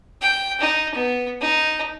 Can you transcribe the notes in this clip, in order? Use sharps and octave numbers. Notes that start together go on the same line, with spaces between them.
G5
D#4
B3
D#4